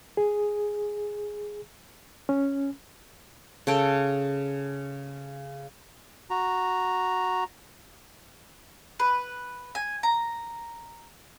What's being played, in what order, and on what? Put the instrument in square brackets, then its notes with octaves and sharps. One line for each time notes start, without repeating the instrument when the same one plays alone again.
[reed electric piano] G#4
C#4
[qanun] C#3 A4 G5
[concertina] F#4 A#5
[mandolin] B4
G#5
A#5